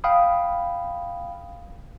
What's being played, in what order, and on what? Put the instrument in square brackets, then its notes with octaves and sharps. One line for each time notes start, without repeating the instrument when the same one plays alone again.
[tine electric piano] F5 G5 B5 D#6